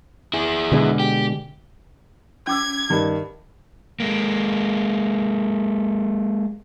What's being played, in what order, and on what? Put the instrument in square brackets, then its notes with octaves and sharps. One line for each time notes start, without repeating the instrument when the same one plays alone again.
[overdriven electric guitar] E4 G#4
[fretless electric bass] B2 D3 G#3
[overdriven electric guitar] G4
[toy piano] C#4 D6 E6 [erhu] G#6
[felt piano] G2 D#3
[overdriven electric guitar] G#3 A#3